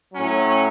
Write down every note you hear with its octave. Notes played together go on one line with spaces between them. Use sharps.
A2 F#3 C#4